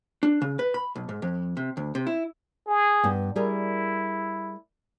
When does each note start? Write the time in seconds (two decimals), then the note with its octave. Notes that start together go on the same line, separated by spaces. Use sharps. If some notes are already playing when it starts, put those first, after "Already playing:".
0.23 D4
0.42 C#3
0.59 B4
0.74 B5
0.96 B1
1.09 G#2
1.22 F2
1.57 C3
1.77 D2
1.95 C3
2.07 E4
2.67 G#4
3.03 G2 B3
3.36 G3 E4 G#4 A#4